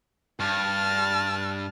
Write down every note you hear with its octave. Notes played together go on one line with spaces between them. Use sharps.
G2 A5 F6